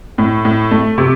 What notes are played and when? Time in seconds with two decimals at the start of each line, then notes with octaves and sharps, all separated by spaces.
0.18 A2
0.45 A2
0.71 A3
0.98 C3